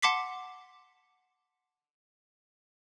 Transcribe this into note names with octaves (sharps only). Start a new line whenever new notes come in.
F#5 A5 C6 D6 B6 C7